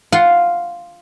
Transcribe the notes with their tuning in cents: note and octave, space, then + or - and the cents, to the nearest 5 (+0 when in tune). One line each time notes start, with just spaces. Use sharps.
F4 +0 F#5 +0 C6 +0